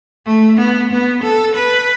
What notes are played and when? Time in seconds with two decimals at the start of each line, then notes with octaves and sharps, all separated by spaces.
0.26 A3
0.58 B3
0.91 B3
1.23 A4
1.55 B4